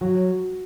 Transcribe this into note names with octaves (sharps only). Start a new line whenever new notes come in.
F#3 F#4